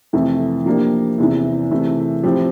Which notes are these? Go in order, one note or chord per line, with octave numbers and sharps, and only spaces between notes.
F2 C3 E3 A3
F3 A#3 D4 G4
E2 C3 E3
C3 E3 A3
A2 F3 C4 G4